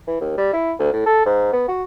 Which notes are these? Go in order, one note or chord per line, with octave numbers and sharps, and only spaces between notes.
E3
D#2
G3
E4
D2
A2
A4
G#2
B3
F#4